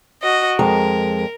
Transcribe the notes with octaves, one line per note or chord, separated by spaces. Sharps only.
F#4 D#5
F2 G#3 A#4 A#5